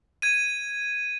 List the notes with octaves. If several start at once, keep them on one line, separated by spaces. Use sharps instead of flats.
G#6 D#7